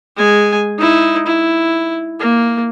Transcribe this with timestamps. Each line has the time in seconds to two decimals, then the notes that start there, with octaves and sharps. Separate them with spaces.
0.17 G#3 G#5
0.78 D#4 E4
1.26 E4
2.20 A#3